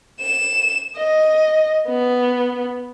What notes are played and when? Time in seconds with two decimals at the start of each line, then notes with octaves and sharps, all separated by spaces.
0.20 E7
0.96 D#5
1.88 B3